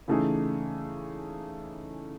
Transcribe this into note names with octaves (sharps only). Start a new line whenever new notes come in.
C#3 E3 A3 D#4 G#4